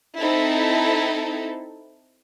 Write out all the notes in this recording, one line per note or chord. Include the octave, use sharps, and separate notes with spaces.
C4 D#4 E4 A4